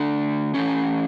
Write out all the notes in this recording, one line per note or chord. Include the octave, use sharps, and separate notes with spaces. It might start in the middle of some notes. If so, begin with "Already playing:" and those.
Already playing: D3 A3 D4
E3 A3 C#4